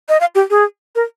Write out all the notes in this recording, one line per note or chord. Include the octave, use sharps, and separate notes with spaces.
D#5
F5
G4
G#4
A#4